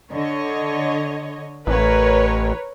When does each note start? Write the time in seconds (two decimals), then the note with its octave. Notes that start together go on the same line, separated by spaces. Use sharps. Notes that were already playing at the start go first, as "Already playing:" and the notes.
0.10 D3 C#5 D#5
1.67 A1 A#4 B4 C#5